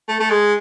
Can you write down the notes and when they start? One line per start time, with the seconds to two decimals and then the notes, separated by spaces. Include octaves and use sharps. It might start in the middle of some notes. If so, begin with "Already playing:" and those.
0.09 A3
0.20 A3
0.30 G#3